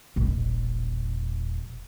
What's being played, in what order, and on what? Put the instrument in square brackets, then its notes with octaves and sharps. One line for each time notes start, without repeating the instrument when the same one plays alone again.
[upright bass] E1 A#1